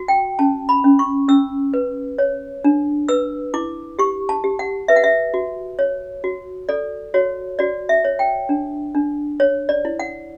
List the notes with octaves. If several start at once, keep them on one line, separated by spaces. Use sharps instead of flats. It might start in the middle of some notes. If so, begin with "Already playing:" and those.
Already playing: F#4
G5
C#4 A5
B5
C#4
C#6
C#4 E6
B4
C#5
D4
B4 E6
E4 D6
G4 C#6
A5
G4
F#5
B4 E5
F#5
E5
F#4
C#5
F#4
A4 D5
F#4 C#5
F#4 D5
E5
C#5
G5
D4
D4
C#5
D5
E4
F#5